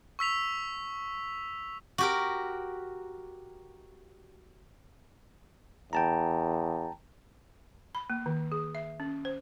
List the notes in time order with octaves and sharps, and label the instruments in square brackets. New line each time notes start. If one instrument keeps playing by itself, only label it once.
[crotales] C#6 E6 B6 F7
[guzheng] F#4 G4 A#4
[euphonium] E2 [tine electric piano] G5 A5 A#5
[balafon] B5
A#3
D#3
G#4
E5
C#4
C5